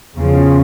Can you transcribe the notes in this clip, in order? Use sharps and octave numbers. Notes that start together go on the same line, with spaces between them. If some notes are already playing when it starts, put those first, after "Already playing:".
E2 C#3 F3